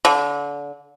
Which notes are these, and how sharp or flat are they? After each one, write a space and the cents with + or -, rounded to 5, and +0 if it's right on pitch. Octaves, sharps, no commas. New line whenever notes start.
D3 -30